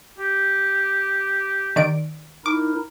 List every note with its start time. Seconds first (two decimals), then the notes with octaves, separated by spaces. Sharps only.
0.19 G4
1.76 D#3 D5 D7
2.46 D#4 E4 A#4 D6